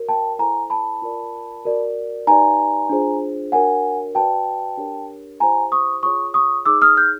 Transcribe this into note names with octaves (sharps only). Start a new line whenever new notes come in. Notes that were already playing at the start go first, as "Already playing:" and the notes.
Already playing: F#4 A#4 C#5
G5 A5
E4 A4 C5 G#5 A#5
A5 B5
F4 A#4 D5
F#4 A#4 D5
D#4 G4 B4 D5 G#5 A#5
D4 F4 G#4 C5
D4 F#4 A#4 C#5 F#5 G#5
F#4 B4 D5 G5 A5
D4 G4 A#4 C#5
E4 G4 C5 G#5 A#5
C#6 D#6
F4 G#4 C#5 C#6 D#6
C#6 D#6
D#4 G#4 C#5 D6 E6
D#6 F6
F6 G6